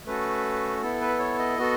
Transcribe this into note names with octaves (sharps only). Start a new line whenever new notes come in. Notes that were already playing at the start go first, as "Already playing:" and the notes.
A3 C#4 F#4 A4 B4
B3 E4 A4
B4
C#5
D#5
B3 F#4 A4